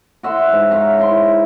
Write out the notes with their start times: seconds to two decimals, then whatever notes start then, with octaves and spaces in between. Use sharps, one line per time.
0.23 F#4 E5 F#5 C6
0.53 G#2
0.71 C#5 E5 F5 A#5
0.99 E4 C6